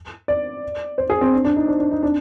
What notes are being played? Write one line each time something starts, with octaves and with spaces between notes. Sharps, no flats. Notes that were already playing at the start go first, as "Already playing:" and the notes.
D5
C5
G#4
C4
D4
D4
D#4
D4
D4
D#4
D4